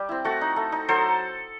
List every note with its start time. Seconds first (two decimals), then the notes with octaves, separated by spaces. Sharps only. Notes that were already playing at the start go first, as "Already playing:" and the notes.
Already playing: G3 G4
0.09 C4 E4
0.24 A3 F#4 A4
0.41 D#4
0.56 A3
0.72 D#4
0.89 F#3 A4 C5